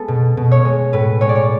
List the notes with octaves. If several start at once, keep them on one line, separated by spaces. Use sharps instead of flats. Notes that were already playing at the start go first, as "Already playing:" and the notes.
Already playing: G#3 B3 A4
B2
B2
C#5
G#3
A2 B4
G#3 C#5
D5
C#5